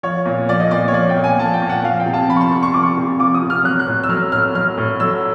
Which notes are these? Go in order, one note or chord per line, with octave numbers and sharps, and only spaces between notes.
F3 C#5
A#2
F3 D5
D#5
A#2 D5
C#5
F3 D5
G5
A#2
G#5
F3 A5
G5
A#2
F#5
F3 F5
G5
C3
A5
F3 B5
C#6
C6
C3 C#6
C#6
F3 D6
C#6
C3
F3 D6
D#6
C3
F6
F#3 F#6
F#6
A2
E6
F#3 F6
A2 F6
F#3 F6
A2
F#3 E6